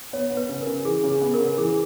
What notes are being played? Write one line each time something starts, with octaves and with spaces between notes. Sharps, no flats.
B3 C#5
B3
B4
C#3
A#4
C#3
E3 G#4
C#3
G#4
B3
A#4
C#3
E3 G#4